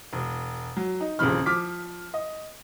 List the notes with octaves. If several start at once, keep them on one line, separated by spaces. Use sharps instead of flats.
E1
F#3
D#4
D#1 F2 C#3 E3 B5 F6
F3 D6 F6 B6
D#5